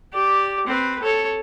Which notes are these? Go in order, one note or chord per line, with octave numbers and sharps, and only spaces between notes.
G4 D5
C4 B4
A4 C#5